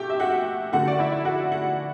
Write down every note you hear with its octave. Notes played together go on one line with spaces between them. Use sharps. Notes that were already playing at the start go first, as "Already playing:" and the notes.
Already playing: B2 A3 G4 G5
E5
F#4 F#5
D3 A3 F#4 F#5
D5
E4 E5
F#4 F#5
F#4 F#5